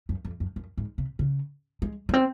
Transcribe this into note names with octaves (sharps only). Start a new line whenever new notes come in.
F#2
F2
F#2
F#2
G#2
C3
C#3
G#3
A#3
C4